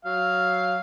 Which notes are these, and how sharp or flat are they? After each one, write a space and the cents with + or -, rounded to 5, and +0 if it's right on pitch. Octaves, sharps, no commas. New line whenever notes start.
F#3 +0 F5 +0